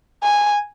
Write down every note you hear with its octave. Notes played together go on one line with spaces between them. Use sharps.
G#5